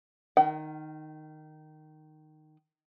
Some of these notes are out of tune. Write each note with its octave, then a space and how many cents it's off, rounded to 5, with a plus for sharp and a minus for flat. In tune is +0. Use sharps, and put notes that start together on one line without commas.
D#3 -10 F#5 +45